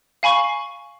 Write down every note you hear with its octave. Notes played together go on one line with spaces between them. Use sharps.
F5 G#5 B5 C#6